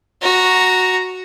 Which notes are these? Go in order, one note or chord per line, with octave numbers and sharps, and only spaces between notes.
F#4 A#5